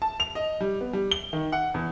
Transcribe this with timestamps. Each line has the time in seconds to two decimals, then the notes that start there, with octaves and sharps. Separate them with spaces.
0.02 A5
0.20 F7
0.35 D#5
0.61 G3
0.81 B3
0.93 G3
1.11 G7
1.33 D#3
1.52 F#5
1.74 E2